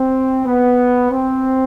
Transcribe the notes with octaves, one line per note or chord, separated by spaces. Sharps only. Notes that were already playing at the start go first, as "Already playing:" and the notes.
Already playing: C4
B3
C4